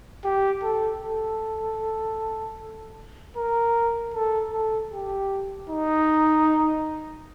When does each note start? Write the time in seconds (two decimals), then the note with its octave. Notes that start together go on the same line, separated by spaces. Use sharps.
0.24 G4
0.63 A4
1.02 A4
3.36 A#4
4.14 A4
4.53 A4
4.92 G4
5.70 D#4